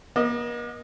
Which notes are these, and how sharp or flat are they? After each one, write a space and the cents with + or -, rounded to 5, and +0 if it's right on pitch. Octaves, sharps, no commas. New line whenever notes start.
A#3 +45 D#5 -5